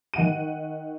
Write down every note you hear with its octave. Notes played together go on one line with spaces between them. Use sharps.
D#3 F#5 D#7